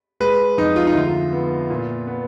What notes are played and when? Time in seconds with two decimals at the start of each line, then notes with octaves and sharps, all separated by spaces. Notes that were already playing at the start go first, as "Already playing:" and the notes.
0.20 G#3 B4
0.58 F2 D#4
0.76 F4
0.87 D#4
0.95 D2 F4
1.33 B3
1.70 A#2
2.07 B3